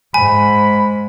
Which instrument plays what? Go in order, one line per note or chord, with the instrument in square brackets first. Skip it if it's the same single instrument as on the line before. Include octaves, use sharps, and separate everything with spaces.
[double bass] G#2 [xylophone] G#5 [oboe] B5